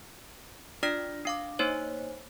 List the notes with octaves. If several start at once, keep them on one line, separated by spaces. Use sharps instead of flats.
D4 F4 D5 F6 A#6
D4 F5 D6
A#3 D#4 C5 C#5